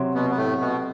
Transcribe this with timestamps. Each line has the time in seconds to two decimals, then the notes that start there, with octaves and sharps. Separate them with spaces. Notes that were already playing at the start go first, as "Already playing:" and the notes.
Already playing: C3 F#3 C4 F#4
0.14 B2 B3
0.30 B3
0.37 A2 A3
0.61 B2 B3